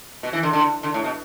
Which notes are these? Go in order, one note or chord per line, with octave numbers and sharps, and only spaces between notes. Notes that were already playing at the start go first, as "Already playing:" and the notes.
B2
E3
D3
D3
D3
A2
B2